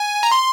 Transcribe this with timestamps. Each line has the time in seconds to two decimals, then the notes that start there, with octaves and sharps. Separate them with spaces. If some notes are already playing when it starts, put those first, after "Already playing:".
Already playing: G#5
0.23 A#5
0.32 C6